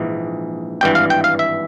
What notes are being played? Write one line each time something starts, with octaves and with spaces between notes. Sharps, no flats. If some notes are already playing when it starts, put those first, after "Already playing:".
Already playing: A#1 G#2 E3
G#1 G2 E3 G5
F5
G5
F5
E5